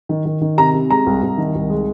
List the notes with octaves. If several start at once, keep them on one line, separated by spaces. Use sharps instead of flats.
D#3
D#3
D#3
C3 A#5
C3
G#3 A#5
C2
C2
D#3
C2
G#3